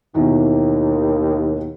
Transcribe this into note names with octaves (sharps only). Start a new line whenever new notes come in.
D#2 B2 D#3 E3